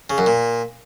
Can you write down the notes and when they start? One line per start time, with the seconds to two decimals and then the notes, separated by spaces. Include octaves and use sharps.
0.10 C#3
0.18 F#2
0.26 A#2